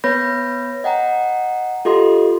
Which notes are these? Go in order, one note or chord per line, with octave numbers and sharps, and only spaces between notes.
B3 B4 C#5 B5 G6 A#6
D#5 F#5 G5 A#5
F4 G4 A4 D#5 C6